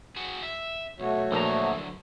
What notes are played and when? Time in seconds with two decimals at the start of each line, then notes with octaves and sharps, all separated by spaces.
0.16 F#4 G#4
0.43 E5
1.00 B1 A3 F#4 C#5
1.32 A#1 D3 F#3 A#5